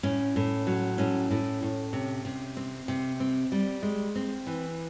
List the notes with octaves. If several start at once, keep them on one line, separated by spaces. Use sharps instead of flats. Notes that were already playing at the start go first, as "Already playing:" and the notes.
A2 C#4
A2
F#3
A2 C#4
A2
A2
C3
C3
C4
C3
C4
G3
G#3
C4
E3